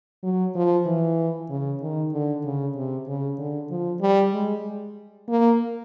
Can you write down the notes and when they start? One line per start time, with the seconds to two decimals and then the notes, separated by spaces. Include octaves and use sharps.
0.23 F#3
0.55 F3
0.86 E3
1.50 C#3
1.81 D#3
2.13 D3
2.44 C#3
2.76 C3
3.08 C#3
3.38 D3
3.70 F3
4.01 G3
4.33 G#3
5.28 A#3